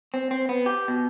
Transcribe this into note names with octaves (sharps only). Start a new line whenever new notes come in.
C4
C4
B3
G4
B2